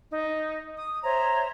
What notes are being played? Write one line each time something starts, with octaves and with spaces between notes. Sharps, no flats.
D#4
D#6
C5 C#5 E5 A#5